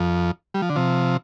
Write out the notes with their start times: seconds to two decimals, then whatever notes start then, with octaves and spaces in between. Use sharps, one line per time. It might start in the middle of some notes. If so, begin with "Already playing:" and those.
Already playing: F2
0.54 G3
0.62 F3
0.69 D3
0.76 C3 F3